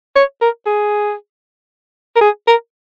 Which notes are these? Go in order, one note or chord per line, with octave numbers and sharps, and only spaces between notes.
C#5
A#4
G#4
A#4
G#4
A#4